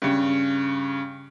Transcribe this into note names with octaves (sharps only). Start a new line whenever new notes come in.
G2 C#3